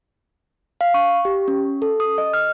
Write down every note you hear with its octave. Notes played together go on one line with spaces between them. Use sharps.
F5
C#6
G4
C#4
A4
D#6
D#5
F6